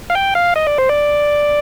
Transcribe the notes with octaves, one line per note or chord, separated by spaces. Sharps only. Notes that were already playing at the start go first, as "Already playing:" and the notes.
F5
G5
F5
D#5
D5
C5
D5